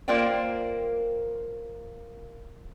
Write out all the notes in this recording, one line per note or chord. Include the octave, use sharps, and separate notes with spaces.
A#3 F4 A#4 C5 D5 G5